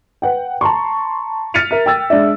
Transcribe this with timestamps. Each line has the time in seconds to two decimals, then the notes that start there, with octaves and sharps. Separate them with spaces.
0.22 B4 F#5 G5
0.61 A5 A#5 C6 C#6
1.54 F6 A6 B6 C#7 D#7 F7
1.71 A#4 E5 F6
1.86 G5 E6 A6
2.10 G#3 D4 D5 E5